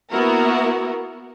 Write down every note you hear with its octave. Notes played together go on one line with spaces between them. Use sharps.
A#3 B3 E4 F#4 A#4